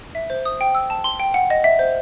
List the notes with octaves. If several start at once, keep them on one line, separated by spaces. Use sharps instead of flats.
E5
C5
D#6
G5
E6
A5
C6
G5
F#5
D#5
E5
C5